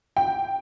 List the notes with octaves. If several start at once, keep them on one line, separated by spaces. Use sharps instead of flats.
G5